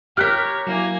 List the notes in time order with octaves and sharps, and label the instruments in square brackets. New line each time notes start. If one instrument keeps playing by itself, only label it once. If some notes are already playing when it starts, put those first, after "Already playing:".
[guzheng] G4 A#4 [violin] C#5 [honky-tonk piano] F6 F#6 B6
[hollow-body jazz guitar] F#3 E4 [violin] A#3 G#5